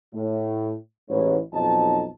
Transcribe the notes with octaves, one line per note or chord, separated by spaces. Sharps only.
A2
A1 G#2 B4 C#5
B1 F2 F#3 D#4 D#5 A5